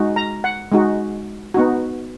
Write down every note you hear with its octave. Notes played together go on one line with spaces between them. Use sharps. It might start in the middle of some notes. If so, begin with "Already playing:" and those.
Already playing: G#3 D#4 F#4
A#5
F#5
G#3 D#4 F#4
B3 D#4 F#4